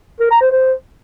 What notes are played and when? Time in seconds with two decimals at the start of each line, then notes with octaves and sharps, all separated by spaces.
0.20 A#4
0.31 A#5
0.41 C5
0.51 C5